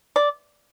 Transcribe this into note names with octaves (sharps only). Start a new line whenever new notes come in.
D5